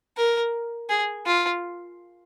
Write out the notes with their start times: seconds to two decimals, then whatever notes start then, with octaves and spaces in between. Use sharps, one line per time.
0.17 A#4
0.90 G#4
1.26 F4